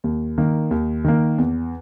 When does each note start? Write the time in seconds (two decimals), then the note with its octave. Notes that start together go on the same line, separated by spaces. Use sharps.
0.04 D#2
0.38 D#3 A#3
0.71 D#2
1.05 D#3 A#3
1.38 E2